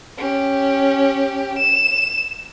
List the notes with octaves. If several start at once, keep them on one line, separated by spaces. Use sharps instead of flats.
C#4 G4
E7